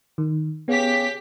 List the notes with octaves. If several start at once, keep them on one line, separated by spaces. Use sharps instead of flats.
D#3
C#3 B3 G4 B6